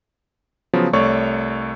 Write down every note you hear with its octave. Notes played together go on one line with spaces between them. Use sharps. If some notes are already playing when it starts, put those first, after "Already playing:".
C#3 F3 F#3 B3
C2 A3 C#5 D5 C#6